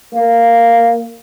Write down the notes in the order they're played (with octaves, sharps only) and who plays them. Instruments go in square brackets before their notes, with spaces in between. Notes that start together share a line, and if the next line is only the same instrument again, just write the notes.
[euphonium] A#3